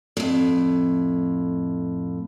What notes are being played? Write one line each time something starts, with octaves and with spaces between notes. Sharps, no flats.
F2 A2